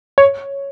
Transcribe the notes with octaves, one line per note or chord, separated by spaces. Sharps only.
C#5